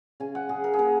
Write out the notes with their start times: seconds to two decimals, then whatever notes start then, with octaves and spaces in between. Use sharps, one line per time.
0.20 C#3 G#5
0.35 F#5
0.49 C#3 G#4
0.64 A#4
0.74 G#4
0.79 A#3 A#4